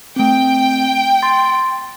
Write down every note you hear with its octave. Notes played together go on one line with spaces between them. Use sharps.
A3 C4 G5
C6 A6